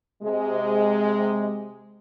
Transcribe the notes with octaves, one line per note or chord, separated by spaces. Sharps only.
C3 G#3